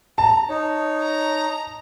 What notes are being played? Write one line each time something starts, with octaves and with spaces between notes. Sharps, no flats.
A5 A#5
D#4 C#5
A#5